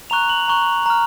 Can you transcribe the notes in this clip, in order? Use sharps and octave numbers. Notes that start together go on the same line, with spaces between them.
A#5 C#6 F#6 F7
F#7
A#5 C#6 F#6
A#5 F6